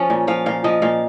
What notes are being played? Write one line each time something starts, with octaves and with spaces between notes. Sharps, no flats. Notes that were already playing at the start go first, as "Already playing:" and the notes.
Already playing: F3 C#4
A#2
F3 F5
A#2 F5
F3 D#5
A#2 F5